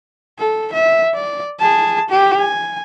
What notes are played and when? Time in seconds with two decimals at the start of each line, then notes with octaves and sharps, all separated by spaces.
0.39 A4
0.73 E5
1.15 D5
1.59 G#4 A5
2.10 G4
2.39 G#5